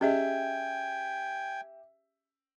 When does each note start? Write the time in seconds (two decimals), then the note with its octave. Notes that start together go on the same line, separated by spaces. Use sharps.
0.01 C#4 G4 G#4 D#5 E5 G5 G#5